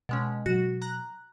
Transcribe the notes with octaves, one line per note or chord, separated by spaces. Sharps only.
B2 G#3 C#4
B2 F#3 F#4
A#5 F#6